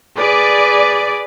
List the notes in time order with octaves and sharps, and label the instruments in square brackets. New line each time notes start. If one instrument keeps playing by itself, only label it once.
[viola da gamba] G#4 B4 [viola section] D5